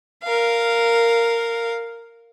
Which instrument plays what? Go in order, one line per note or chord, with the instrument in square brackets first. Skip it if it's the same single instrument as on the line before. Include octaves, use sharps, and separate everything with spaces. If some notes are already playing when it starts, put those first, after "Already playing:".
[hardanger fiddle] A#4 F5